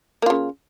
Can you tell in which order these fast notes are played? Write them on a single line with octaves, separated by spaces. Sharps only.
A#3 F4 C#3